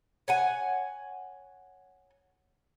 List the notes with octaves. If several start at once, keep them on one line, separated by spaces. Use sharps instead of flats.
C#5 F#5 G#5